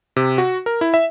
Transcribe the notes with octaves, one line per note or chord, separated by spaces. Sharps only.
C3
F#4
A#4
E4
E5